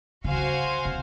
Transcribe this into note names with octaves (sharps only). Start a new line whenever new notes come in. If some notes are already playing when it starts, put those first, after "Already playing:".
C#3 F#4 C5 F5 G#5
C3